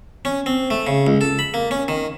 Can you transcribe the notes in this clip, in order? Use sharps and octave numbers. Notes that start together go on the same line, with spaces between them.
C#4
C4
A3
C#3
C#2
A4
B5
A#3
C#4
D#3